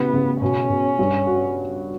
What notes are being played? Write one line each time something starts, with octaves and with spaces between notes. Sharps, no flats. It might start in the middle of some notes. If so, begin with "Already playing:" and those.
Already playing: A1 C#3 B3
C#3
B2 C#4
B2
G2
F#4